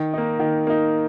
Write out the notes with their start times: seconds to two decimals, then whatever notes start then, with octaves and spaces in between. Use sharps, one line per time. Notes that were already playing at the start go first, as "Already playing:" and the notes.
Already playing: D#3
0.14 A#3 D#4
0.39 D#3
0.67 A#3 D#4